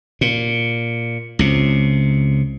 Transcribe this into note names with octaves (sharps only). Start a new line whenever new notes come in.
A#2
C#2 C3